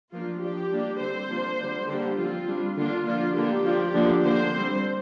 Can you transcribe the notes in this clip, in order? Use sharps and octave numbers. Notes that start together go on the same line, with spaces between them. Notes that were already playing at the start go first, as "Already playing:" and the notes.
F3 A#3 D4 F4
F3 D4 G4
G3 A#3 D4
D3 G3 C4 C5
F3 A#3 D4
D3 G3 D4
D3 G3 A#3 D4 G4
F3 C4 F4
G3 D4
D3 A#3 D4 F4
D3 F3 A#3 D4 F4
D3 A#3 D4 G4
F3 A#3 D4
D3 F3 A#3 D4
D3 A#3 D4 C5
G3 C4